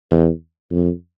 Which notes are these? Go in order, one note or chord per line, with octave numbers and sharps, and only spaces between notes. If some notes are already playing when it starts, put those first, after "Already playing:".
E2
F2